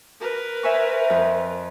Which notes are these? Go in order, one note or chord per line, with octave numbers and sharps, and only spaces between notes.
A#4 B4
C5 E5 G#5 C#6
F2